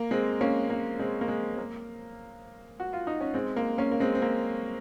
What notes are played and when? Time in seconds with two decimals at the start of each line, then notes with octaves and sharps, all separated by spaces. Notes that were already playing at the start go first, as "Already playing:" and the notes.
Already playing: A#3
0.11 G#3 C4
0.41 A#3 C#4
0.70 A#3
0.99 G#3 C4
1.21 A#3
1.28 G#3
1.58 A#3
2.80 F#4
2.93 F4
3.07 D#4
3.21 C#4
3.34 G#3 C4
3.56 A#3
3.78 A#3 C#4
3.91 A#3
4.00 G#3 C4
4.15 C4
4.22 A#3